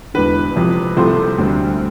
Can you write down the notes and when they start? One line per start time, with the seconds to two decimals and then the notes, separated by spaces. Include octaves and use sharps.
0.14 E1 E2 D3 B4
0.56 F2 C3 E3
0.97 C2 C3 F3 A3 C4 C5
1.38 D2 D3 G3 C4